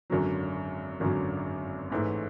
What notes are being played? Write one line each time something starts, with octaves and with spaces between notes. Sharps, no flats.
G#1 F#2 D3 F#3
G#1 F#2 D3 F#3
A1 G#2 E3 A3 E4